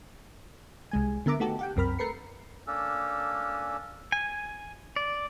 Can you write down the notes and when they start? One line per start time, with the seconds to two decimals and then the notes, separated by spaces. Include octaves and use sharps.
0.91 C2 G#3 G#5
1.26 D3 B3 A#4 E5 A#5 D6
1.40 A3 B3 D#4 F#4 G4 A4
1.59 G4 F#5 G5
1.76 C2 F#2 C4 A#4 B5 F6
1.99 A3 A#4 B4 C7 C#7
2.67 A#3 C#4 D4 A4
4.12 G#5
4.96 D5